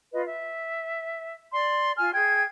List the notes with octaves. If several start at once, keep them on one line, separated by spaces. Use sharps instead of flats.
F4 B4 D#5
E5
D5 C6
F4 G#5 F6
G#4 G5 G#6